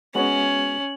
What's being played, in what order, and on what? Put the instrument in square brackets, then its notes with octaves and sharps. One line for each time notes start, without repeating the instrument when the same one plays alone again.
[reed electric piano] G#3 B3 F#4 [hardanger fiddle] C#4 [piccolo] F#7